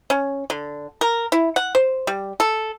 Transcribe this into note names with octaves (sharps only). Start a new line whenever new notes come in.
C#4
D3
A#4
E4
F#5
C5
G3
A4